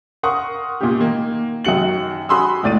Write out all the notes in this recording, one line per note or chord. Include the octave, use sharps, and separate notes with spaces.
A#4 F#5 C6 C#6 D#6
A#2 A#3 G4
D#3 A#3
F#2 D#3 F#4 C#7 F#7
F#4 G#4 B5 C6 D#6 E6
C#2 A2 D5 A6 D#7